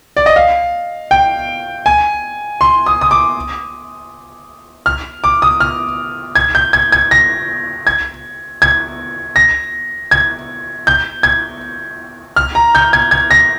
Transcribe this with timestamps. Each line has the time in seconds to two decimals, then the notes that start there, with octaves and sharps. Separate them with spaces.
0.17 D5
0.26 D#5
0.36 F5
1.11 G5
1.86 G#5
2.61 C6
2.86 D#6
3.01 D#6
3.11 D6
4.86 F6
5.24 D6
5.42 D#6
5.60 F6
6.35 G#6
6.55 G6
6.73 G#6
6.92 G#6
7.11 A#6
7.87 G#6
8.62 G#6
9.36 A#6
10.11 G#6
10.87 G6
11.23 G#6
12.36 F6
12.55 A#5
12.75 G6
12.93 G#6
13.11 G#6
13.31 A#6